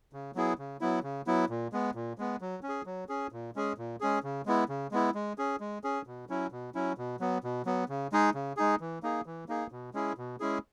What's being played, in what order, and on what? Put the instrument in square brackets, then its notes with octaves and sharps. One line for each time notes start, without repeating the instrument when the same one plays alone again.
[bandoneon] C#3
F#3 B3 E4 G#4
C#3
F#3 B3 E4
C#3
F#3 B3 E4
A#2
G#3 B3
A#2
G#3 B3
F#3
C#4
G#4
F#3
C#4 G#4
A#2
G#3 C#4 G#4
A#2
G#3 C#4 G#4
C#3
G#3 B3 E4
C#3
G#3 B3 E4
G#3
C#4 G#4
G#3
C#4 G#4
B2
F#3 C#4 E4
B2
F#3 C#4 E4
B2
F#3 B3
B2
F#3 B3
C#3
G#3 D#4 G#4
C#3
G#3 D#4 G#4
E3
A#3 D#4 G#4
E3
A#3 D#4 G#4
B2
G#3 C#4 E4 G#4
B2
G#3 C#4 E4 G#4